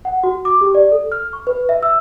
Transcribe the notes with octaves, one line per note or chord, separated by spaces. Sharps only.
F#5
F#4
D6
G4
D5
A4
F6
C#6
B4
E5
E6